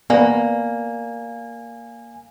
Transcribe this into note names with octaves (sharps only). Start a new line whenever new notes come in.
A#3 B3 B4 D5 G#5